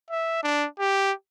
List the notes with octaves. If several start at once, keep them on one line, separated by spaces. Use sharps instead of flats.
E5
D4
G4